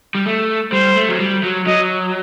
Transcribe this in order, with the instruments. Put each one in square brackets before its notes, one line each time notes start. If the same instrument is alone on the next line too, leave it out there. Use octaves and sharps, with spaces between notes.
[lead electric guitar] G3
A3
[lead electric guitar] G3 [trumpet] C5
[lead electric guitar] A3
F#3
G3
F#3
[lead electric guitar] F#3 [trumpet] D#5